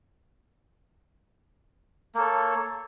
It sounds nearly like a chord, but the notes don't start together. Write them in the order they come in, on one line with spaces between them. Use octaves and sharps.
A#3 A4 C#5